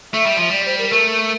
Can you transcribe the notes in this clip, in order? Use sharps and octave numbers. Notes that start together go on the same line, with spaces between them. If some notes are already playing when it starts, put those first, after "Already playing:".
A3 E5
G3
F3
G3 D5
C5
A#4
A3 A#4